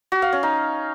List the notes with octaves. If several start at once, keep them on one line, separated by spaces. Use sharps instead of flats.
F#4
F5
C#4
D#4